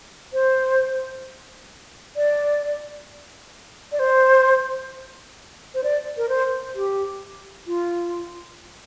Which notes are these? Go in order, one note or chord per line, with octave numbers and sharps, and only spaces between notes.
C5
D5
D5
C5
C5
D5
A#4
C5
G4
F4